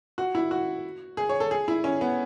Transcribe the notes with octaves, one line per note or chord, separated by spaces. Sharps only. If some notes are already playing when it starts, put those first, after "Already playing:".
F#4
E4
F#4
G#4
C#5
A4
G#4
E4
C#4
B3